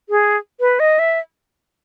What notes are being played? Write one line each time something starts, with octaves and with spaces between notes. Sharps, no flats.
G#4
B4
D#5
E5